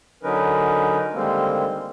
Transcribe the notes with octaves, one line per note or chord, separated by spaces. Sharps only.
D3 F#3 C#4 D#4 A#4 B4
D3 D#3 G3 G#3 A#3 C4